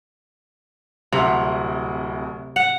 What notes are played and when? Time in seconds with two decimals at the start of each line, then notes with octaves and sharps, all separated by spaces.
1.13 D1 C2 C3 F#5
2.56 F#5